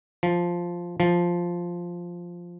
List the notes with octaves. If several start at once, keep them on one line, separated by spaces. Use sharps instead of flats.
F3
F3